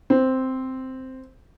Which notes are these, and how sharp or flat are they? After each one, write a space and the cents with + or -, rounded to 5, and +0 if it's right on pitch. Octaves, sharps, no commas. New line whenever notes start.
C4 -5